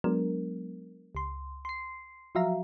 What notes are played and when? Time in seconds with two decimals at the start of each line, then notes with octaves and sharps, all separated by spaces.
0.04 F#3 G#3 B3 D4 A#4
1.15 C#2 C6
1.65 C6 C7
2.35 F3 F#3 F#4 E5 F5 A#5